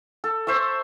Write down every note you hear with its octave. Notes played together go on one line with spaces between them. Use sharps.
A4
C5 E5 C#6 E6